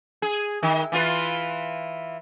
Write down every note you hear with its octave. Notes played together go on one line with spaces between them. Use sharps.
G#4
D#3
E3 F4 B4